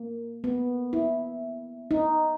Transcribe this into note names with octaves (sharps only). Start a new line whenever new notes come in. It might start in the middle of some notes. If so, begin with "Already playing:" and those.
Already playing: A#3
B3
E4
D#4